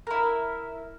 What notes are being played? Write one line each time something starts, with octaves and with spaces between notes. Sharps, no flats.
E4 A#4